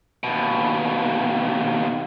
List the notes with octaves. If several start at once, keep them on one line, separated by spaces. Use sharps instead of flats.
D#2 B2